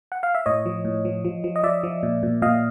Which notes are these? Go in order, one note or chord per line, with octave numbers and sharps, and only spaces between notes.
F#5
F5
E5
A2 C#5 D#5
F3
A2
F3
F3
F3
D#5
F3 D5 E5
F3
A#2
A#2
A#2 D#5 F5